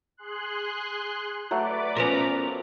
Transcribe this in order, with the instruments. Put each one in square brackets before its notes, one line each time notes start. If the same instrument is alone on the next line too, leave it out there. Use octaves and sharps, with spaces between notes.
[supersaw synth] G#4 C6 F#6
[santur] F#3 A3 [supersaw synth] B4 D5 D6
[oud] F3 B3 C#4 [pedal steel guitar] A#4 A#5